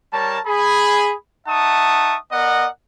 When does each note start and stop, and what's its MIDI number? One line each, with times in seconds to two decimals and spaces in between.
0.12 0.38 55
0.12 0.38 70
0.12 0.38 73
0.12 0.38 81
0.46 1.13 68
0.46 1.13 83
1.47 2.16 63
1.47 2.16 76
1.47 2.16 78
1.47 2.16 81
1.47 2.16 85
1.47 2.16 87
2.31 2.66 59
2.31 2.66 70
2.31 2.66 74
2.31 2.66 75
2.31 2.66 78